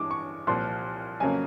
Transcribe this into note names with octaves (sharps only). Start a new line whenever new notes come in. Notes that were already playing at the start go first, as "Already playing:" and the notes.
Already playing: G2 E3 G#3 D6
C#6
C2 A#2 F3 C6
F2 C#3 F#3 A#3 G#5